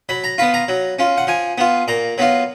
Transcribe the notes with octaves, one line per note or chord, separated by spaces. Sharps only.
F#3 B5
A#5
B3 F4 B5
A#5
F#3
C#4 F4
F#5
F3 G#5
B3 F4
A#2 A#5
F#3 B3 F4